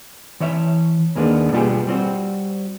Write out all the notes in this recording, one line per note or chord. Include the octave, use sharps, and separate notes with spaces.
E3 C#5 E5
D#2 G#3 A#3 B3 D4
B2 G3 B3 F4 G4 G#4
G3 C4 F#4